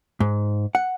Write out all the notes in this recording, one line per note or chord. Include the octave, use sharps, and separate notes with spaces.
G#2
F#5